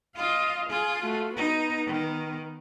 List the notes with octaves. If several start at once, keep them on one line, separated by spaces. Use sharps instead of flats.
F4 D#5 F5
F4 G#4
A3 F#4
B3 D#4
D#3